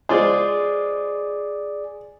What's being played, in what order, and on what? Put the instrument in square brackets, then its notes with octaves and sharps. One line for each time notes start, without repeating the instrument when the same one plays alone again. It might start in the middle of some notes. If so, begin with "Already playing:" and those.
[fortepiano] G#3 F4 C5 [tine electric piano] G#4 D5